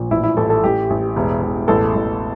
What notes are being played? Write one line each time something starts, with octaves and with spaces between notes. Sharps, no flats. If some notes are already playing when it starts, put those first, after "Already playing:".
Already playing: A#1 A#2
A1 E4
E4
A1 A4
A4
A1 G4
A1
E1
E1
A1 A4
A1